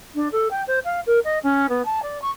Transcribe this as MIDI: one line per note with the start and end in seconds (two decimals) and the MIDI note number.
0.15 0.28 62
0.32 0.48 69
0.50 0.62 79
0.67 0.79 72
0.84 1.00 77
1.06 1.19 70
1.24 1.38 75
1.43 1.66 61
1.69 1.84 59
1.85 2.00 81
2.02 2.20 74
2.21 2.30 85